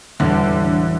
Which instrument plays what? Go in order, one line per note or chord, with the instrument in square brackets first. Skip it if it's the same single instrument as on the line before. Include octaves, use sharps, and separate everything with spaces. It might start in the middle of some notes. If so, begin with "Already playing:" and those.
[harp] E1 A5 [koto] A2 [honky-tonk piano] D3 [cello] G3